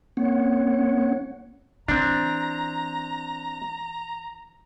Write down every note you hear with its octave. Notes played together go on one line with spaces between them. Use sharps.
A#3 C4 C#4 C#5 F#5
E3 C4 D4 A#5